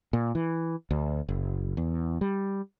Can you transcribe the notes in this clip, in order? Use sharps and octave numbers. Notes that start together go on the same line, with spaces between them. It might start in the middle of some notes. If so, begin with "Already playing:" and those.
A#2
E3
D2
F#1
E2
G3